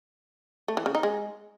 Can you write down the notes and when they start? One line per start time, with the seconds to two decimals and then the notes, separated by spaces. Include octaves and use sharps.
0.68 A3
0.77 E3
0.86 C#3
0.95 D#4
1.03 G#3